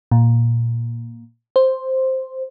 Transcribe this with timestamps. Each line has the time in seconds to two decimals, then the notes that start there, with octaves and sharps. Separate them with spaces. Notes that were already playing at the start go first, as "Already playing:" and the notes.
0.12 A#2
1.56 C5